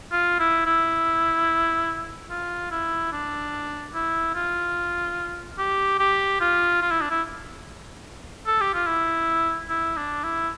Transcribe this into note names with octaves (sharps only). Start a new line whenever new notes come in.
F4
E4
E4
F4
E4
D4
E4
F4
G4
G4
F4
F4
E4
D4
E4
A4
G4
F4
E4
E4
D4
E4